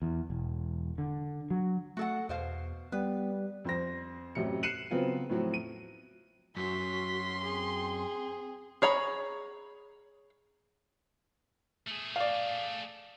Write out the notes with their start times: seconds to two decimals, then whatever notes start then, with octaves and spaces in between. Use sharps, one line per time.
0.02 E2
0.30 E1
0.98 D3
1.50 F#3
1.97 A3 F#4 A4 F#5
2.29 E2 B2 C5 F5
2.92 G3 B3 B4
3.65 F2 C5 A#6
4.35 A1 F#2 C3 C#7
4.63 F#6 C7 C#7 D#7 E7 F#7
4.91 C#3 F#3 B3 C4 F4 B4
5.30 A2 F3 F#3 C4
5.54 D#7
6.57 F#2 C#4 F#4 C6 B6
7.44 C4 G#4
8.82 G#4 C#5 A#5 B5
11.87 A3 G#4
12.16 D5 F5